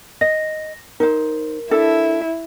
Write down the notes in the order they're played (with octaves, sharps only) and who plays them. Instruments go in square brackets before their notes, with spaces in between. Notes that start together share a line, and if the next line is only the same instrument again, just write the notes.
[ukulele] D#5 [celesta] A#6
[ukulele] D#4 C5 [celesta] A#4
[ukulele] D4 A4 [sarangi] E4